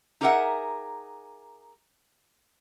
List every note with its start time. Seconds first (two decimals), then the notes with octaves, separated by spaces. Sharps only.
0.21 D#4 G4 G#4 A#4 E5 F#5